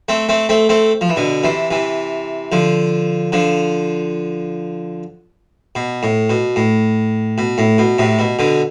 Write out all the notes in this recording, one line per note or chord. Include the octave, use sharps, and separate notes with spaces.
A3 C4
A3 C4
A3 C4
A3 C4
F3
E3
B2 D3
C3 E3
C3 E3
D3 F3
D3 F3
B2
A2
B2
A2
B2
A2
B2
A2 C3
B2
B2 D3